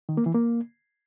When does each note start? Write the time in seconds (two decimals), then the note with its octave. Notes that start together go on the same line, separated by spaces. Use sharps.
0.09 D#3
0.17 A#3
0.26 E3
0.35 A#3